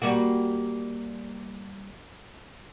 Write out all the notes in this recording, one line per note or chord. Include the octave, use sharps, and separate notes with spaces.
G3 A#3 F#4